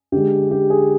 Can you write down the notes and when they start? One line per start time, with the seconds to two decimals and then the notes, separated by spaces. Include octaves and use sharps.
0.12 D3 G#3 G4
0.51 G4
0.70 G#4